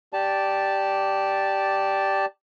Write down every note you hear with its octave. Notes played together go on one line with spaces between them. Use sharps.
G4 D5 A5